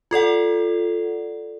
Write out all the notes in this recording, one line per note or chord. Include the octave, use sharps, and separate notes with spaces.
F4 A4 D5 F#5